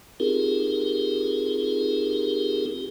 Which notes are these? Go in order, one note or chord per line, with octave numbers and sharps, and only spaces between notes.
C4 D#4 F4 G4 G#4 A#4